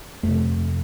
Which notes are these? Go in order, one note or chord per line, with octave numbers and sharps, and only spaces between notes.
F2 C3 A3